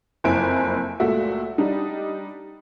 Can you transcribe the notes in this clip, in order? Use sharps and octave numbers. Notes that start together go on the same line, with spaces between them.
F#1 F2 E4 C5 G#5 D7
C#2 A#2 A3 F#4 E5
G3 D4 D#4